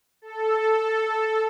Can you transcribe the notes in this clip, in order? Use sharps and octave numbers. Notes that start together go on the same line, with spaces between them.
A4